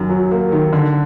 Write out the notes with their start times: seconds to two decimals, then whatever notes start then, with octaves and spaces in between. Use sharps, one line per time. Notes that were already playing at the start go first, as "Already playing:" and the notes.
Already playing: F#2 D#3
0.09 F#3
0.31 A#3
0.52 D#3
0.73 D3